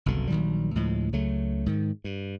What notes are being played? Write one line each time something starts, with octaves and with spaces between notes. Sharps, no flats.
F#1 C2 B2 D3
A#1 D#3 F#3 G3
D2 A2 F3 G#3
C#2 C#3 F#3 A3
G#2 D#3
G2